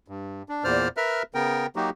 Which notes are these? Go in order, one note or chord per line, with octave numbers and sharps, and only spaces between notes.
G2
D4
E2 A#2 C5 D5 F6
A#4 B4 E5 F6
C#3 B3 A#4 G5
F#3 A#3 D#4 F#4 G4